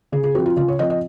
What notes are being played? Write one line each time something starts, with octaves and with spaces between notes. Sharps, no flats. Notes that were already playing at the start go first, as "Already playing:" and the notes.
C#3 G#4
G#4
F3 C4 F#4
F4
C#3 F4
C#5
F3 C4 D#5
D#5